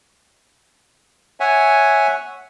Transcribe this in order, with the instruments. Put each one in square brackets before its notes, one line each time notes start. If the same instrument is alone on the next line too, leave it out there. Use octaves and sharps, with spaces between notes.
[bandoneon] C#5 E5 F#5 G#5